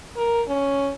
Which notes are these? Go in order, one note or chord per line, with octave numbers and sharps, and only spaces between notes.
A#4
C#4